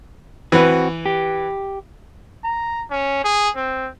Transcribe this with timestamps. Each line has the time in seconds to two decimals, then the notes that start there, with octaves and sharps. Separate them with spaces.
0.52 E3 C4 F#4 B4
1.06 G4
2.44 A#5
2.90 C#4
3.24 G#4
3.56 C4